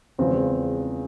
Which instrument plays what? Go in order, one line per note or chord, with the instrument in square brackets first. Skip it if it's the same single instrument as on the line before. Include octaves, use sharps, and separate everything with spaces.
[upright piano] E2 C#3 F3 G#3 C4